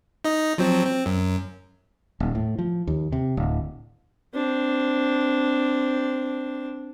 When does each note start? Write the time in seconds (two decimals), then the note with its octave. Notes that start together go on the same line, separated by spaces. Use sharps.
0.24 D#4 D#5
0.58 F3 F#3 C4
0.86 C4
1.06 F#2
2.20 D#1
2.35 A2
2.59 F3
2.87 D#2
3.12 C3
3.37 D1
4.34 C4 D4